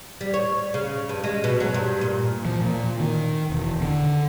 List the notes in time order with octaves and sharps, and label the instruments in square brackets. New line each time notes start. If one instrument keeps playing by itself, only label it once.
[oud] G3
C#5
C#3
G2
G#3
B2
F#3
G2
A#2
[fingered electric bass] F3
A#2
D#3
E1
D3